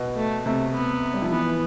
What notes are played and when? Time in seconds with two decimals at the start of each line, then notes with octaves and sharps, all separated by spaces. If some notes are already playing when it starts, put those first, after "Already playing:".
Already playing: B2
0.16 A3
0.45 C3 A3
0.74 B3
1.14 G3
1.22 F3
1.31 E3 B3